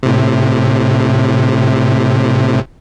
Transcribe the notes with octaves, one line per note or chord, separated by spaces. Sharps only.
A2 C3